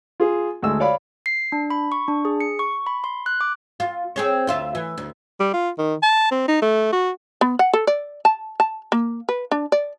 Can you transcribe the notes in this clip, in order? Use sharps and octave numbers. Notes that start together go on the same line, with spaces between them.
F4 G#4
D2 G#3 E6
C#5 D5 F5 B5
C7
D4
B5
C#6
D4
G#4
C#7
C#6
B5
C6
F#6
D6
F4
C4 G#4 C#5
D2 F4 E5
E3
D2
G3
F4
D#3
A5
C4
D#4
A3
F#4
B3
F#5
A4
D5
A5
A5
A#3
B4
D4
D5